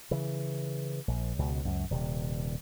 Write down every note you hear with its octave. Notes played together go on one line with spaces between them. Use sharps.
C#3 E3
A#1
C#2 B2
C#2 F#2
D#1 C3